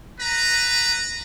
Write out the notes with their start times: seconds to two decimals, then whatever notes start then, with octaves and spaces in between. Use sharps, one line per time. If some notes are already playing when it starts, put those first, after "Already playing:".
0.19 B4 A#5